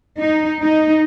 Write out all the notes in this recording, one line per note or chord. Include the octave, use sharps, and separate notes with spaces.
D#4
D#4